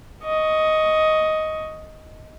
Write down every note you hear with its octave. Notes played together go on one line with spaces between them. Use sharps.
D#5 C#6